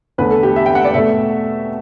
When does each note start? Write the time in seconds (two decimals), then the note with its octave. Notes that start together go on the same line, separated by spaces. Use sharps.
0.18 E2 D3 A3 B4
0.31 A4
0.43 G4
0.56 E5
0.66 G5
0.75 F#5
0.85 D5
0.94 B2 A3 E5